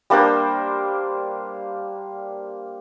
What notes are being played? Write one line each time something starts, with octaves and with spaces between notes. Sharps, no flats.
G3 A#3 D4 C5